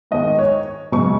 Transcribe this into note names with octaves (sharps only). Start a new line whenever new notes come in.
G#2 D#3 G#3 D#5
C#5
F#2 C#3 G#3 C#6